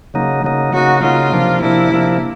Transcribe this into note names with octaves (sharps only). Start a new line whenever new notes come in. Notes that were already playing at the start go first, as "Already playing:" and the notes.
C#3 F#3 A#3 D#4
C#3 F#3 A#3 D#4
C#3 F#3 A#3 D#4 F#4
C#3 F#3 A#3 D#4 F4
C3 F3 A#3 D4
C3 F3 A#3 D4 E4
C3 F3 A#3 D4